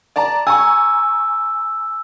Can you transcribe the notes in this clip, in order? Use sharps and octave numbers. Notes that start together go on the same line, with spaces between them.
D5 A5 A#5
G#5 A#5 C#6 E6